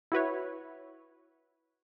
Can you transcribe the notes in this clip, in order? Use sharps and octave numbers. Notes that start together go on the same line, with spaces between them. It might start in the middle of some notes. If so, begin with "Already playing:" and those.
E4 F#4 B4 C#5